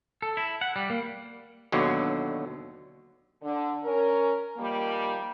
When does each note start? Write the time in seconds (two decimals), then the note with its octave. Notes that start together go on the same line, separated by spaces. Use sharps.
0.22 A4
0.37 E4
0.61 F#5
0.76 G3
0.90 A#3
1.72 D#2 B2 D3 F#3
3.41 D3
3.84 C#4 A#4
4.56 D#3 F3 G3 A#3